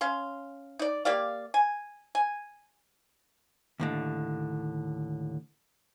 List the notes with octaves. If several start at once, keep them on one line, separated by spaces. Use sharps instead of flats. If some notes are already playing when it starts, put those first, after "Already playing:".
C#4 F5 C6
D#4 D5
A#3 G4 D5 F5
G#5
G#5
D#2 A2 D3